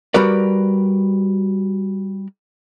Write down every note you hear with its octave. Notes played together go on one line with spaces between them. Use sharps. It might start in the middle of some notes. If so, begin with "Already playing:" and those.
G3 F#4 A#4 B4 D5